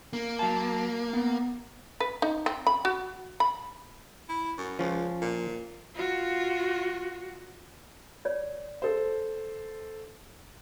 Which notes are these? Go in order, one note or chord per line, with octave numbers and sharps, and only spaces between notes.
A#3
F#3 A5
B3
B4
D#4
C4
B5
F#4
B5
E4
F#2
C#2 F3 C#4
A#2
F4 F#4
C#5 D5
A4 C5